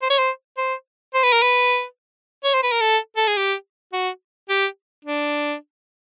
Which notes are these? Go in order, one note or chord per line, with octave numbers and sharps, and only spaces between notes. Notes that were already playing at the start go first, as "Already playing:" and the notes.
C5
C#5
C5
C5
C5
B4
A#4
B4
C#5
C5
B4
A#4
A4
A4
G#4
G4
F#4
G4
D4